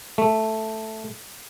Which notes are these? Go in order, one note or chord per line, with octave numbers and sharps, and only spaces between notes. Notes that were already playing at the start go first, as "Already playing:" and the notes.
A3